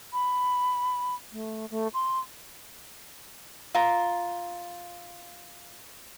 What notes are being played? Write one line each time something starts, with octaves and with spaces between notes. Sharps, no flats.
B5
A3
A3
C6
F4 A#5